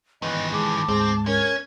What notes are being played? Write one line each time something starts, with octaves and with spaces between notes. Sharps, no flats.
D#3 E3 B3 B4 D#5
G#3 A5 D6
D2 G#2 G#3 C4
C#4 A#4 G#6